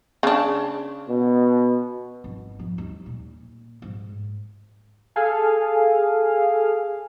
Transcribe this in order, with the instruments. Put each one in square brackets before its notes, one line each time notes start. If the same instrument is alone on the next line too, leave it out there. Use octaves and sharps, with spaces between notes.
[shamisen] C#3 D4
[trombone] B2
[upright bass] G#1
F3
D#2
A#2
G#2
[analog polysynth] G#4 A4 F5 G#5